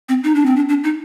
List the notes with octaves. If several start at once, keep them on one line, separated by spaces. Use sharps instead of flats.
C4
D#4
D4
C4
D4
D4
D#4